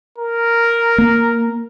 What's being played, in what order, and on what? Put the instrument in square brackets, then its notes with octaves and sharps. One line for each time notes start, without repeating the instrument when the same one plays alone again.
[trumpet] A#4
[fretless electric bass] A#3